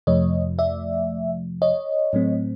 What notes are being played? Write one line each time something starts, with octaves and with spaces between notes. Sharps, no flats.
F2 C3 F3 A3 C#5 D#5
D5 E5
C#5 D#5
A2 F#3 A3 C4